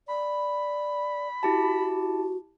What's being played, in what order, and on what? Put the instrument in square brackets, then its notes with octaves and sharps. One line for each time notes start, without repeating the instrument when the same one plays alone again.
[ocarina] D5 [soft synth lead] B5
[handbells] E4 G4 A5 [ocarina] F#4